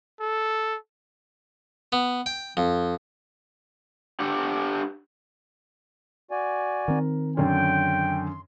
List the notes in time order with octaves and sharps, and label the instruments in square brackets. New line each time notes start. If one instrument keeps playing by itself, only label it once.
[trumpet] A4
[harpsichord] B3
G5
F2
[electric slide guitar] D4 G4 F#5
[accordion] F#4 D5 G#5
[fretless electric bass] D#3 C4 [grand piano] A#4
[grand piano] F#2 D3 C#4 [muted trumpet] G5 [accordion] C6